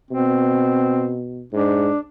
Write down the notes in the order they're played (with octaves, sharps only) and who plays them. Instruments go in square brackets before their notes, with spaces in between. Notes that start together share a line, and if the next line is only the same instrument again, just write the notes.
[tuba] B2 [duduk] C4
[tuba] G#2 [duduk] D4